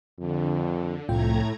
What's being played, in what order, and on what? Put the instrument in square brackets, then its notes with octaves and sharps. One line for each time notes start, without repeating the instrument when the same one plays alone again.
[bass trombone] F2 [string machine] D3
[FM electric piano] C2 F4 G5 [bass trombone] F2 [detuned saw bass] A2 [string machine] A3 A#5 G#6